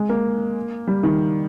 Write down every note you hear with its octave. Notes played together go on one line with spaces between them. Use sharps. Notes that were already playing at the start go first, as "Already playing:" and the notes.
Already playing: G#3
A#3
G3
D#3